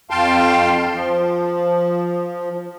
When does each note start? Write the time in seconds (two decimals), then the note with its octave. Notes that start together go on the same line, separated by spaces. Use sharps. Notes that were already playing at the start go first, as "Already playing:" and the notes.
0.10 F2 F5 G5 A5 C6
0.93 F3